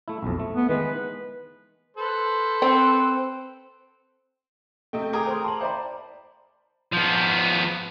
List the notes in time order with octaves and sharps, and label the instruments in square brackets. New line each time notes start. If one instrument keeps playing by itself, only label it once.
[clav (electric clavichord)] A3 E4
B1 F2
A3
[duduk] B3
[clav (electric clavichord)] D#3 E3 G#3 [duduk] B4
[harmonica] A4 B4 C5
[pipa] C4
[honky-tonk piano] C3 D#5 G5 [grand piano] A3
[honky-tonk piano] G#4 G5 D#6 [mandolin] A#4 [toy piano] D6
[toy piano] C5 C#5 C6
[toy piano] A5 B5 [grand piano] C6 [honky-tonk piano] D6 F#7
[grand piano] C5 D5 B5 [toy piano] G5 A#5
[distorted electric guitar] F3 B3